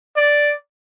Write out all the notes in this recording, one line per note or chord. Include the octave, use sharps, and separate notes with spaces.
D5